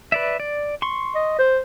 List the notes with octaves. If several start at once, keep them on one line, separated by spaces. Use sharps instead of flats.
B4 D5 E5
D5
C6 C#6
D#5
C5